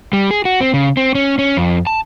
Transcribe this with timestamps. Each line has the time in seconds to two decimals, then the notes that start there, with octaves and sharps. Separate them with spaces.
0.13 G3
0.31 G#4
0.45 F#4
0.61 C4
0.74 C#3
0.97 C4
1.15 C#4
1.39 C#4
1.57 F2
1.87 A5